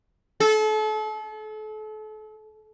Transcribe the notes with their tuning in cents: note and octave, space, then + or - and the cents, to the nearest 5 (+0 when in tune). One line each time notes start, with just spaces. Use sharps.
A4 -35